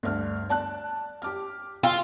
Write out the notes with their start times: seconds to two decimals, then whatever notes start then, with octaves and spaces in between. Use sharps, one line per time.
0.03 D2 G2 F6
0.49 D5 A5 F#6
1.22 G4 D6 F6
1.83 F4 G5 C6 E6